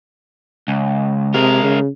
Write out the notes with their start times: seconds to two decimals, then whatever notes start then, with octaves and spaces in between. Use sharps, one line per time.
0.68 C#2
1.34 C3 G#3 A#4
1.63 C#3